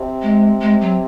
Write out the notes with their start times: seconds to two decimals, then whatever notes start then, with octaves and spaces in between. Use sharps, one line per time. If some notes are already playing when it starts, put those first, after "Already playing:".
Already playing: C3
0.22 G#3
0.61 G#3
0.81 F#3